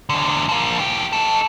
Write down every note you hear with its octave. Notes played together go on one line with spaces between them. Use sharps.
E2 D3
F3 A#3
E3 G4
D#4 A4